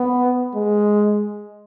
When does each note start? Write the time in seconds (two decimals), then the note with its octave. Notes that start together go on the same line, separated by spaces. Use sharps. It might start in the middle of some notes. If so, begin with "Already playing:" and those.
Already playing: B3
0.55 G#3